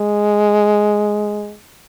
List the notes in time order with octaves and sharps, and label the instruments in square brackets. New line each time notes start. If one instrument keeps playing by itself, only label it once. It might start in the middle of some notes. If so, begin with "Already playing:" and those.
Already playing: [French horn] G#3